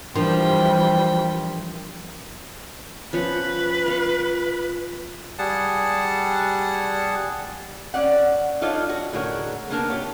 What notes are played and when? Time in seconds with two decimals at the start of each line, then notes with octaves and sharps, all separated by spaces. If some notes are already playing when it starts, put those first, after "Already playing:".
0.16 E3 F3 G3 D4 A#4 G5 C6
3.13 F3 C#4 B4 F#5
3.86 F4 F5 C#6
5.39 G3 G#4 F#5 A5
7.94 C#4 D5 F#5
8.61 D4 D#4 F4 A4 C#5 D#5
8.89 F#4
9.13 A2 D3 G#4 A#4 C#5 F#5
9.70 A#3 B3 D4 A#4 A5
9.90 F4 G4 C#5